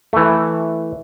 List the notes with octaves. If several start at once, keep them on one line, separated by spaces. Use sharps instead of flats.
E3 A3